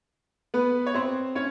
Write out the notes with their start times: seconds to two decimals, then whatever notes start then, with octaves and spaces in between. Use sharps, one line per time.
0.54 B3 B4
0.87 C#5
0.94 C4 C5
1.35 C#4 C#5